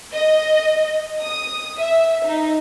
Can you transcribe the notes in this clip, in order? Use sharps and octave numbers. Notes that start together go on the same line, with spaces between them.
D#5
D#6
E5
D#4